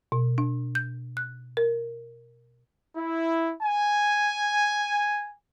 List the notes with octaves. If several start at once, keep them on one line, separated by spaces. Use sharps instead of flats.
B2
D4
G6
F#6
A#4
E4
G#5